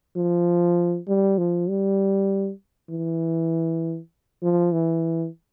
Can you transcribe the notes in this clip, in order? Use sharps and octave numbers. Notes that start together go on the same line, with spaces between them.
F3
G3
F3
G3
E3
F3
E3